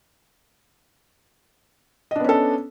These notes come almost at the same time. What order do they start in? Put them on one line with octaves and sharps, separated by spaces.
D#5 D4 B3 C#4 A4